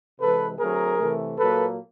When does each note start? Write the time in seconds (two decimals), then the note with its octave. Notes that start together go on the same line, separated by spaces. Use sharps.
0.19 C3 E3 G#3 A4 B4
0.59 D3 F#3 A3 C4 G#4 A#4
0.99 C3 E3 A3
1.37 A#2 F#3 A#3 A4 B4